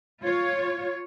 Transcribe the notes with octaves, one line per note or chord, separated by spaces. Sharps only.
F4 C#5